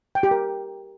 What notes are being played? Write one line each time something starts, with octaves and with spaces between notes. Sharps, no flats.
G5
G4
A#4